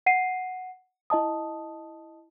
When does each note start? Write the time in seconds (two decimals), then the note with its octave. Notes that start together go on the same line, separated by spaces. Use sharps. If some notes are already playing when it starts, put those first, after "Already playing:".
0.06 F#5 C7 D#7
1.10 E4 D#5 A5 D#6